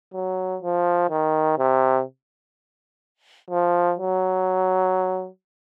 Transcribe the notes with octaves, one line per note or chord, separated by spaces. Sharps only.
F#3
F3
D#3
C3
F3
F#3